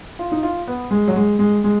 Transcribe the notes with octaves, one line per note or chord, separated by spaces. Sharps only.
F4
D#4
F4
B3
G#3
F#3
G#3
G#3
G#3